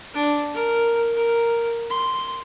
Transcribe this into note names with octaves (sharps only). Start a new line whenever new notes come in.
D4
A#4
A#4
C6